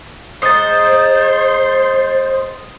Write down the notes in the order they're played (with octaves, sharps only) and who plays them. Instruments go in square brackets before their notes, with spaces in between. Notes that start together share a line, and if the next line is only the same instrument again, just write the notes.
[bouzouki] G#3 D#4 [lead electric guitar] C5 [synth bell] D#6 A6